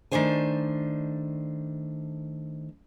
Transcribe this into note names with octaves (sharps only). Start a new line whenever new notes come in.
D#3 E3 A3 D4 C5 G#5